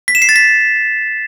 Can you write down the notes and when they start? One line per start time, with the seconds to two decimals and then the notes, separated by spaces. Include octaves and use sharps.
0.08 B6
0.15 E7
0.22 C7
0.29 A6
0.36 B6